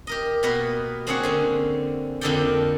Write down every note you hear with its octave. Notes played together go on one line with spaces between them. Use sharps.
G4 A#4 D#5
B2 A#3 B3 A#4 B4
A#3 C4 D4 G#4 C#5 F#5
D3 C4 C#4
F2 D3 A#3 A4 D5 G5